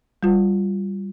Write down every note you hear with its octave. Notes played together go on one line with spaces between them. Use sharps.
G3 F4